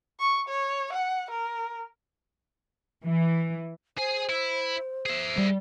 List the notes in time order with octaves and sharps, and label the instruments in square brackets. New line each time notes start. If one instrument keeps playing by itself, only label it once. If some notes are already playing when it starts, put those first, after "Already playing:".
[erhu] C#6
C#5
F#5
A#4
[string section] E3
[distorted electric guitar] G#4 G#5 [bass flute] C5
[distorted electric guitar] E4
G#4 E5
[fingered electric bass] G3